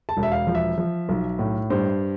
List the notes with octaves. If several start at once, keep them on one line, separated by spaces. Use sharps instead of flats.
A5
E1
E5
F5
F3
E5
F3
B1
A2
G2 C5